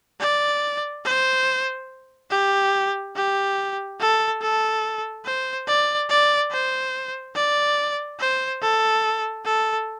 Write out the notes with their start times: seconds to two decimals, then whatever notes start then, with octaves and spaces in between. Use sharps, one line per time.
0.21 D5
1.05 C5
2.31 G4
3.16 G4
4.00 A4
4.42 A4
5.25 C5
5.68 D5
6.10 D5
6.52 C5
7.36 D5
8.20 C5
8.62 A4
9.45 A4